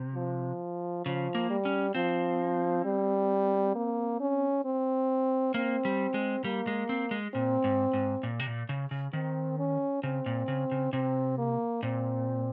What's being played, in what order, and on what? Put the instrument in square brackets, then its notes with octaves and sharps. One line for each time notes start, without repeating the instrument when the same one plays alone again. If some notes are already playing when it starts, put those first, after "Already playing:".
Already playing: [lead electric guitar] C3
[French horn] F3
[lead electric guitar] C#3 [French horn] F3
[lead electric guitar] A#3
[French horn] G3
[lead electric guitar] C#4
[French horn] F3 [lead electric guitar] C4
[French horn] G3
A#3
C#4
C4
[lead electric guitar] A#3 [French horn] C4
[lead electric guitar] G3
G#3
[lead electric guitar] G3 [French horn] A#3
[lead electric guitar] G#3
C4
G#3
[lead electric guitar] A#2 [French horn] C4
[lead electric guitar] G#2
G#2
A#2
C3
A#2
C#3
C#3
[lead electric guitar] D#3 [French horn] C4
[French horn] C#4
[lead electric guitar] C#3 [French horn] C4
[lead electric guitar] A#2
C#3
C#3
[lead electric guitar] C3 [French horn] C4
[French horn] A#3
[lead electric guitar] A#2 [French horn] C4